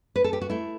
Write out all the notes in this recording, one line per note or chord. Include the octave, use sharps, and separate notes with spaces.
B4
A4
G4
F#4
A3 E4